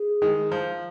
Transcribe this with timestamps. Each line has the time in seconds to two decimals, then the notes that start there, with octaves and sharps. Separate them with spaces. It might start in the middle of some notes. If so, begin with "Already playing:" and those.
Already playing: G#4
0.22 D#3 G#3
0.52 F3